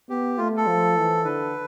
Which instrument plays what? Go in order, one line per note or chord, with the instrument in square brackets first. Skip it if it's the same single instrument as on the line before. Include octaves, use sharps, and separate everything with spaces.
[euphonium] B3 [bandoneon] G4
[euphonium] A3 [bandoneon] F4
[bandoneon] A4
[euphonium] F3
E3
[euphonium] D3 [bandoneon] B4